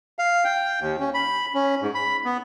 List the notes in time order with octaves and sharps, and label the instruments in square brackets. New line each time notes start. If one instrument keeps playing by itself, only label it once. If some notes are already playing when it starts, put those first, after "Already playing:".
[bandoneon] F5
G5
D#2
C#4
B5
C#4
G#2
B5
B3